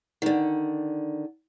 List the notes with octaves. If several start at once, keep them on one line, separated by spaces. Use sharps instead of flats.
D3 D#3